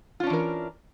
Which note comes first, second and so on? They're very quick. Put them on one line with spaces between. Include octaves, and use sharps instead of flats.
F4 C#4 D4 E3 A#4